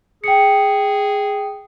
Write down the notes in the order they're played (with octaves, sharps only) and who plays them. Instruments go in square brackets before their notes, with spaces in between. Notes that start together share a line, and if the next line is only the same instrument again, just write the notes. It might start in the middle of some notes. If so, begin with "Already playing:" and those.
[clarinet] G#4 [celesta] G5 C#7